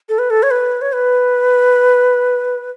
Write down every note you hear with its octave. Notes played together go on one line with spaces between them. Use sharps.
A4
B4
A4
C#5
B4
C#5
B4